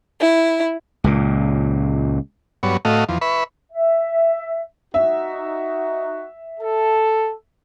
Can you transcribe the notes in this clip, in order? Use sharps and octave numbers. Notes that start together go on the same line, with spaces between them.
E4
C#2 A#2
G2 F#3 B3 C#5
A2 A3 F#4 D#5 F5
E2 F3
B4 E5 B5 C#6
E5
D#4 F#4 E5
A4